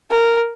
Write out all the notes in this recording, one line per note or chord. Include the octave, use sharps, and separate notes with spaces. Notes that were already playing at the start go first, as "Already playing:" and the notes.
A#4